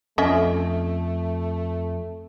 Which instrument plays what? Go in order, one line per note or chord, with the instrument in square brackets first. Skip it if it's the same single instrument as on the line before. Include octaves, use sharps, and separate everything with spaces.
[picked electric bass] F2 [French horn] A3 [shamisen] C#4 D#5 E5 [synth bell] A4